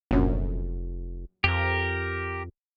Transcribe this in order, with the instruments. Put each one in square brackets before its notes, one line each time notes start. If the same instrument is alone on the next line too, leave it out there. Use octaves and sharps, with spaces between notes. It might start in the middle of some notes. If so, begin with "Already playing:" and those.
[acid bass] F1 [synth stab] A#1 F#2
[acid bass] F2 [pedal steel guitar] G4 A#4